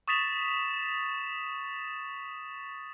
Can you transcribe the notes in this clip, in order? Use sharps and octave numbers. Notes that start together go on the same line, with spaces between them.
C#6 D#6 A6 B6 E7 F7